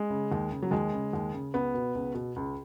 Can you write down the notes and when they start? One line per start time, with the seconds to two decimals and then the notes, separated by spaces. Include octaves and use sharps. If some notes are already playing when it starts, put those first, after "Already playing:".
Already playing: G#3
0.10 C#3
0.32 D#2
0.51 C#3
0.62 F#3
0.71 D#2 G#3
0.93 C#3
1.13 D#2
1.34 C#3
1.54 C#2 B3
1.74 B2
1.95 C#2
2.15 B2
2.36 C#2